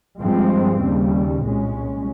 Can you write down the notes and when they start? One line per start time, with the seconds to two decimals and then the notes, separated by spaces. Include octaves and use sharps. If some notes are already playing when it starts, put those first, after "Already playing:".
0.21 G2 F3 G#3 C4
0.82 D#2 C#3 G3
1.44 C2 A#2 G#3 C#4